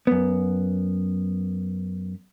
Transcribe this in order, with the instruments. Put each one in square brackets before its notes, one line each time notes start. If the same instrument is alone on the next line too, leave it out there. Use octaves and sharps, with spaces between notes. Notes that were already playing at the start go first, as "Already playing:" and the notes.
[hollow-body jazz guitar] F#2 B3